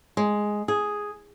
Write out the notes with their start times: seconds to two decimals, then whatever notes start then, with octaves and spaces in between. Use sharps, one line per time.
0.17 G#3
0.68 G#4